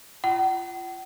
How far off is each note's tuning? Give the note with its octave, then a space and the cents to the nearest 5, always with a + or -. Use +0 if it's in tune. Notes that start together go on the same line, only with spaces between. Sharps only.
F4 -25 F#5 +45